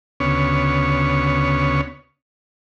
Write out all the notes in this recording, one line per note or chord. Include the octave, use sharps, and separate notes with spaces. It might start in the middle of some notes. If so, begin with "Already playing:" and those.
D2 C#3 B3 C#5